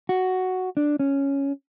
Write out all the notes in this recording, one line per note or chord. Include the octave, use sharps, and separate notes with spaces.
F#4
D4
C#4